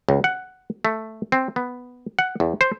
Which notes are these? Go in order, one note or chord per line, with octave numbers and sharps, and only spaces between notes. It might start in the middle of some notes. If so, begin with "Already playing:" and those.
C#2
F#5
A3
C4
B3
F#5
E2
C5